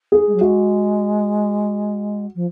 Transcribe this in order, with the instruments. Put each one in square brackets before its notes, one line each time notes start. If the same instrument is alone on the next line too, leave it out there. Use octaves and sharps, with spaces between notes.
[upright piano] G#4
[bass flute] G#3
F#3
[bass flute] G#3 [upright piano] F#4
[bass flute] F3